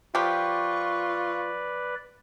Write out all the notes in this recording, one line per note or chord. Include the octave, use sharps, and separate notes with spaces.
F3 F4 G4 B4 D5 C#6